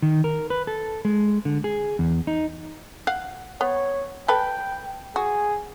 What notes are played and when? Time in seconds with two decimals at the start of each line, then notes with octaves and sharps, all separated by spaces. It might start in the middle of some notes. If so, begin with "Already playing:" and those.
0.02 D#3
0.24 A#4
0.50 B4
0.67 A4
1.05 G#3
1.45 D3
1.64 G#4
1.99 E2
2.27 D#4
3.07 F5 F#5
3.61 B3 C#5
4.28 A4 B4 G5
5.16 F#4 G#4